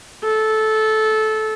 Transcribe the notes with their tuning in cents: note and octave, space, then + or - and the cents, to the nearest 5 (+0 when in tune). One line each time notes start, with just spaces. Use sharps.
A4 -15